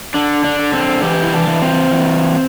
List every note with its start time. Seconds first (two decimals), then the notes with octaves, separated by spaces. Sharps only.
0.14 D3 D4
0.44 D4
0.59 D3
0.73 C4
1.03 E3 G4
1.24 E4
1.33 D4
1.47 E3
1.62 C4
1.91 E3